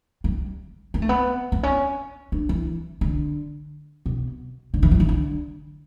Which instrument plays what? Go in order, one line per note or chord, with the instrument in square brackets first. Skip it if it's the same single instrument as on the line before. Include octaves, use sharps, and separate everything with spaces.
[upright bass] G3
B3
A3
B3
B3
C#4
D4
E3
D3
B2
D3
E3
F#3
E3
D3